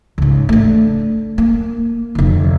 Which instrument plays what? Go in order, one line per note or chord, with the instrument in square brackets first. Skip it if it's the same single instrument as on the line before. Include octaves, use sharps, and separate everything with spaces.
[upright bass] C#2 G#2
A3 D4
A#3
F1 D2